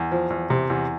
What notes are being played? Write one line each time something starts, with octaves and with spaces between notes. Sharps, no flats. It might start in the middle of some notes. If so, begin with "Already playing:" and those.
Already playing: E2
F3
E2
C3
E2